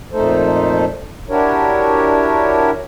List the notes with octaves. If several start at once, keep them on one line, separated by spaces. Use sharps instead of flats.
F2 A#2 A3 D#4 A4 C5
D4 E4 F#4 G4 A#4 C#5